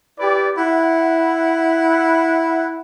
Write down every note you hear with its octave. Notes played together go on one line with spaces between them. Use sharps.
E4 G4 B4 D5
E4 F#5